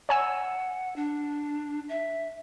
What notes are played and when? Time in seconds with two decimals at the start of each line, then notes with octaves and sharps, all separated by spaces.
0.09 C#5 F#5 G#5 E6
0.96 D4
1.89 E5